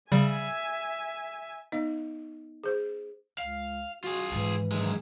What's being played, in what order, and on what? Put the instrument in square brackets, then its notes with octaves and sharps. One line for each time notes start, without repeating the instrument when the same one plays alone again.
[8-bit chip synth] C#3 G3 [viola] E5 G#5
[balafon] B3 D#4 D#5
G#4 C5
[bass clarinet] C#2 [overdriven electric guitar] F5
[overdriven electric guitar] F4 G#4 [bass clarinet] F#4
[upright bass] G#2 D#3 [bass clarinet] E3
[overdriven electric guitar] F#2 G#3